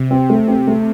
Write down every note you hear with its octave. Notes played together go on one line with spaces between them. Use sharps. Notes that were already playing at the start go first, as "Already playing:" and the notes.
Already playing: C3
C4
A3
C4
A3